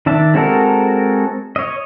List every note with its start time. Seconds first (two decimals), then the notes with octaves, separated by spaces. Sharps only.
0.06 D#3 D4 E5 A5
0.34 G#3 C4 F#4 A4 A#4
1.56 C#5 D#5